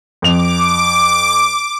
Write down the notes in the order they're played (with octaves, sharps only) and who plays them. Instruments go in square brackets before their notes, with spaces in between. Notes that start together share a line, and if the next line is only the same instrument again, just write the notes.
[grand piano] F2 F7 [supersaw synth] D6